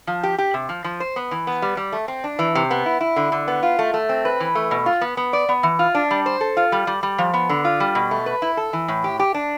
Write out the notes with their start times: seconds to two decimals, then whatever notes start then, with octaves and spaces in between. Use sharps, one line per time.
0.07 F3
0.23 G4
0.38 G4
0.54 C3
0.69 F3
0.84 F3
1.00 C5
1.16 B3
1.31 E3
1.47 B3
1.62 G3
1.77 G3
1.92 A3
2.08 C4
2.24 D4
2.39 E3
2.55 C3
2.71 B3
2.86 E4
3.01 E4
3.16 D3
3.32 D3
3.48 B3
3.63 F4
3.79 A3
3.94 A3
4.09 C4
4.25 B4
4.40 E3
4.55 A3
4.71 B2
4.86 F4
5.01 B3
5.17 B3
5.33 D5
5.49 B3
5.63 E3
5.79 F4
5.95 D4
6.11 G3
6.26 C5
6.41 A4
6.57 F4
6.72 G3
6.87 G3
7.03 G3
7.18 F3
7.34 B3
7.49 D3
7.65 F4
7.80 G3
7.95 B2
8.11 A3
8.26 B4
8.42 E4
8.57 A4
8.73 E3
8.88 A2
9.04 G4
9.19 G4
9.34 D4